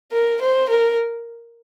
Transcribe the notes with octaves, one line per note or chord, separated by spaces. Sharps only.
A#4
C5
A#4